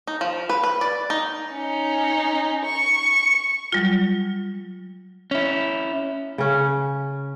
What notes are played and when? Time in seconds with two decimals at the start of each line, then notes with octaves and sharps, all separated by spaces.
0.07 D#4
0.21 F3
0.49 B4
0.63 B4
0.81 D5
1.10 D#4
1.53 C#4 D#4
2.65 C#6
3.72 F#3 G3 F4
5.31 C#4 E4
6.38 C#3 C#4